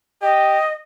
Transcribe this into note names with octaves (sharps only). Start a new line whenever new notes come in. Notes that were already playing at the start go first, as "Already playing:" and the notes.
G4 D#5